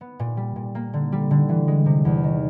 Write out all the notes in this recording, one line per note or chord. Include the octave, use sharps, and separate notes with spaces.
B3
A#2
G3
A#2
A#3
D3
G3
D3
E3
G#3
C3
E2
D#3